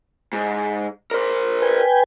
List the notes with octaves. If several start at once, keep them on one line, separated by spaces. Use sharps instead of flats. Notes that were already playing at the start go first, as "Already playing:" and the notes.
G#2
A#4 C5
B4 G5 G#5